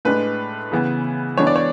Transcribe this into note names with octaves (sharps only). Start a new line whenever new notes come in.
A2 G#3 D4 B4
C#3 E3 B3
E3 G#3 B3 D4 C#5
D5
C#5